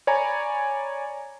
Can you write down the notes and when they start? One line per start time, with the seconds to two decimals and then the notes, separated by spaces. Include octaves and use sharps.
0.07 C#5 D5 G#5 A#5 B5